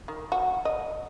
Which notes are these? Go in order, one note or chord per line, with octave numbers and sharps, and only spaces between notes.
D#3
F#4
D#5